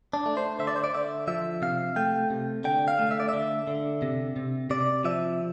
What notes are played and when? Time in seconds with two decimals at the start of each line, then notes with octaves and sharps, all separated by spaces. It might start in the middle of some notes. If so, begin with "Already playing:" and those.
0.13 D4
0.26 A3
0.37 C5
0.59 D3 E5
0.67 D5
0.76 C5
0.84 D5
0.94 D3 E5
1.28 F3 E5
1.62 C3 F5
1.96 A3 G5
2.30 C3
2.64 D3 G5
2.88 F5
2.99 A3
3.11 E5
3.20 D5
3.29 D3 E5
3.68 D3
4.02 C3
4.36 C3
4.70 C3 D5
5.04 F3 E5